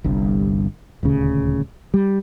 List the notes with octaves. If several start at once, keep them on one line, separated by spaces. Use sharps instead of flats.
G1 C2 G2
D#1 D2 C#3
G3